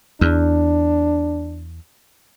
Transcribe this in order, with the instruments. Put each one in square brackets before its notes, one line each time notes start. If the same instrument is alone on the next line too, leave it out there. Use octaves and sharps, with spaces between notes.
[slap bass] E2 [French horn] D4